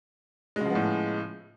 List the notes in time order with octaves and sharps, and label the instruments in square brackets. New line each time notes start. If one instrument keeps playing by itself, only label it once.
[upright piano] G#3
C#3
F3
B3
A2